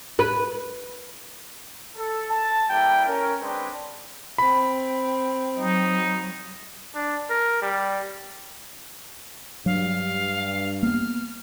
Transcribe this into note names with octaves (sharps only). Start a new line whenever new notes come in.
B4
A4
A5
G3 A#3 E4 A4 G5
C#4 A#4
G#3 C4 D4 B4 D5 G5
C4 B5
F#3 D#4
D4
A#4
G3
G2 F#3 F5
A#3 B3 F6